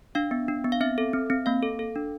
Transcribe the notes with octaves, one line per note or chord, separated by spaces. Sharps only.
D4 F5
B3
D4
B3
F5
C4 E5
A4
C4
C4
A#3 F5
A4
A4
D4